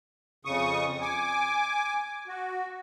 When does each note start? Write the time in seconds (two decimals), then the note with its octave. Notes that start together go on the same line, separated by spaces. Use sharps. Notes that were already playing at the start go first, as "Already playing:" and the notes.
0.45 F2 C#3 C#6 D#6
1.01 G#5 D6
2.27 F#4